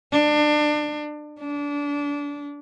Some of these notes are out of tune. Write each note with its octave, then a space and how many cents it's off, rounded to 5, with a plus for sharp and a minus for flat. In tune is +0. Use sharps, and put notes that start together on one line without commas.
D4 +25
D4 -25